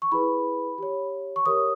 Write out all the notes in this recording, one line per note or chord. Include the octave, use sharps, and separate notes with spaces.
C#6
E4 G#4 B4 B5
G4 C#5
C#6
G4 A#4 C#5 D#6